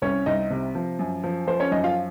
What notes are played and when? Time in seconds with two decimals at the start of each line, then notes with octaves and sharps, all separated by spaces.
0.02 C2 C#4 C#5
0.26 C2 D#4 D#5
0.51 C3
0.75 F3
0.99 F#2
1.24 F3
1.47 F3 C5
1.60 C#4 C#5
1.71 F#2 D#4 D#5
1.84 F4 F5